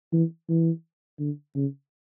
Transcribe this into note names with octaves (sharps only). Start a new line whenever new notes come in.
E3
E3
D3
C#3